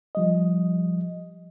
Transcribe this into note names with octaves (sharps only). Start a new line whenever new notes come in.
F3 G3 D#5